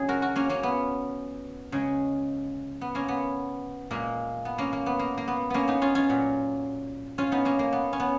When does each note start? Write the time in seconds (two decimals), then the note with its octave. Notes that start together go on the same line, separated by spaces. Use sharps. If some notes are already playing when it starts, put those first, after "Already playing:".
Already playing: C#3 F#3 C#4 D#4 G#4
0.08 F#4 A#4
0.22 F#4 A#4
0.36 A#3 C#4
0.49 A#3 C#4
0.63 B3
1.72 C#3 G#3
2.81 B3
2.95 A#3 C#4
3.08 B3
3.91 A#2 G#3 A#3
4.45 B3
4.58 A#3 C#4
4.73 A#3
4.86 B3
4.99 A#3
5.17 A#3
5.27 B3
5.50 A#3 B3 C#4
5.68 B3 D#4
5.82 C#4 F4
5.95 C#4 F4
6.09 A#2 F#3
7.18 C#4 F4
7.32 B3 D#4
7.45 A#3 C#4
7.59 A#3
7.72 B3
7.93 C#4
8.00 B3